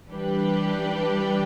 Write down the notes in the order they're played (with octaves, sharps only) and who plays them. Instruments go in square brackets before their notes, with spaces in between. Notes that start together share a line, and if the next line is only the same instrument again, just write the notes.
[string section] E3 G3 D4 G4 B4